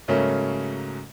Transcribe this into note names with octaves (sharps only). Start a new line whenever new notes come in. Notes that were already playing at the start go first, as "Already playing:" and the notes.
G#2 C#3 F#3 A3 A#3 C#4